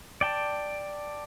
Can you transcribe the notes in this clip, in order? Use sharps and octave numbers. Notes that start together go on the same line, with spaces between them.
D5 G5 A5